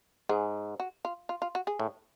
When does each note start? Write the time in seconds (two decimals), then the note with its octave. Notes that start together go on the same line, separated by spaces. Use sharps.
0.29 G#2 G#4
0.80 F#4
1.05 F4
1.29 F4
1.42 F4
1.55 F#4
1.67 G#4
1.80 A2